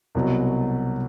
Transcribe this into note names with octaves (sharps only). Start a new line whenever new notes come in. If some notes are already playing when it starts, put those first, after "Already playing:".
C2 B2 F#3